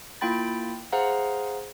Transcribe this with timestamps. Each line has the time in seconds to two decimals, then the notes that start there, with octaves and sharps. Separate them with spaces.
0.21 A#3 E4 F4 G5 B5 A6
0.92 G#4 C5 F5 F#5 A#5